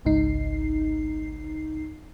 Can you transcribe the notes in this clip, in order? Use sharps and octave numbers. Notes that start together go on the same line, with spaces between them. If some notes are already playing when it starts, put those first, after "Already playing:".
G#1 C#2 G#2 D#4 C7